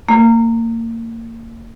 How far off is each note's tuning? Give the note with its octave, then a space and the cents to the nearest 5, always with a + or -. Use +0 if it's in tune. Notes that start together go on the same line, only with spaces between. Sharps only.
A#3 -30